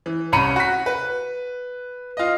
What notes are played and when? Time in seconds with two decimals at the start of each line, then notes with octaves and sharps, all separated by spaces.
0.06 E3
0.32 C2 C#4 A#5 B5 C#7 D#7
0.56 F#4 B6
0.86 B4
2.17 F4 D#5